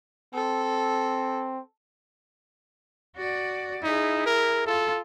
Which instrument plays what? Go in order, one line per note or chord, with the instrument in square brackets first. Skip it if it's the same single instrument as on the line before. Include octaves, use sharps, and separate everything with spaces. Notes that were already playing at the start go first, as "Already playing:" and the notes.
[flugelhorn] C4 [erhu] A4
[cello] F#4 D5
[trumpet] D#4 [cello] E4 G#4
[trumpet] A#4
[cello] F4 [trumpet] A4